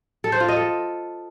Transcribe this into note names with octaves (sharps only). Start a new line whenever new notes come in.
A4
C5
F4
D#5
A4